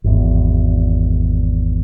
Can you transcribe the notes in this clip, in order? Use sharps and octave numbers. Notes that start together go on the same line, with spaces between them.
G#1 E2